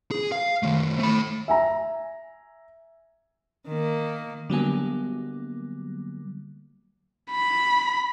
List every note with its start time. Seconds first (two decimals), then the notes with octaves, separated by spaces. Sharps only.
0.11 G#4
0.32 F5
0.63 D#3 A3
0.99 A3 B5
1.48 E5 G#5 A#5
3.67 D#3 A#3
4.50 D3 F#3 G3 A#3 B3 G#5
7.31 B5